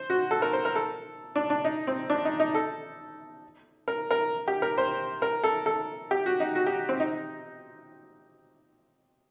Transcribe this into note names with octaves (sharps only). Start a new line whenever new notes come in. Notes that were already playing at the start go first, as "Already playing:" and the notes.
Already playing: C5
F#4
A4
A#4
C5
A#4
A4
D4
D4
D#4
C4
D4
D#4
D#4
A4
A#4
A#4
G4
A#4
C5
A#4
A4
A4
G4
F#4
D#4
F#4
G4
C4
D#4